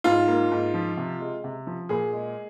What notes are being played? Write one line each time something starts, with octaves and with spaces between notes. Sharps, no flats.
G#2 F4
A#3
G#2
F3
C3
G#3
C3
F3
A#2 G#4
G#3